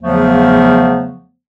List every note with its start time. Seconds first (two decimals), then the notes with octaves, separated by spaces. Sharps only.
0.02 E2 C#3 F3 F#3 A3 B3